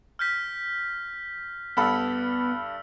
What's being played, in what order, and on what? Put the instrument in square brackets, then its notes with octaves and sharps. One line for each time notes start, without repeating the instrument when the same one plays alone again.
[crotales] F6 G6 B6
[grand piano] G2 A4 B5 [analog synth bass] B3 [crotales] E6 F6